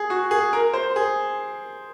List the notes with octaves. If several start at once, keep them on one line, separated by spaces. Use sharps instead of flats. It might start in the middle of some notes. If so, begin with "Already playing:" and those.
Already playing: G#4
F#4
G#4
A#4
C5
G#4